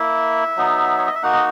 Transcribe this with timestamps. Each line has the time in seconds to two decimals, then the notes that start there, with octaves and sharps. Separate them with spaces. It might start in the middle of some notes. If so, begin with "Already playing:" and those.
Already playing: A#3 E4 E5
0.57 F#3 B3 D#4
0.99 C#5
1.06 D#5
1.15 E5
1.23 A#3 D#4 F#4 F#5
1.33 D#5